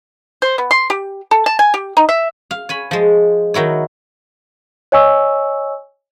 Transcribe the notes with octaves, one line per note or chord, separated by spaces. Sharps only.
C5
B3
C6
G4
A4
A5
G#5
G4
D#4
E5
F5
C#5 G#5 B5
F3 G#3
D#3 F#3 E4 C#5
C#5 D#5 G#5 C#6 E6